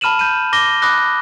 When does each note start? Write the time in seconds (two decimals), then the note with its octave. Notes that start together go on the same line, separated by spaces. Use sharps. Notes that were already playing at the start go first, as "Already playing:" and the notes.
0.01 A5 B5 F6 D#7 E7 F#7
0.19 G6 D#7
0.53 D6 A#6 G7
0.82 B5 D6 D#6 F#6 A#6